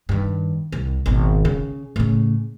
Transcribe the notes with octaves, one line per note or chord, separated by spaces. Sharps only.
G2 D#3
C2
G#1 B2
C#3
A2 C#3